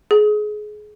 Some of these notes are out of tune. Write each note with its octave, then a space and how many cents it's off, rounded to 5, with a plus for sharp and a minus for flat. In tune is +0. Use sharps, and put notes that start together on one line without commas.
G#4 +25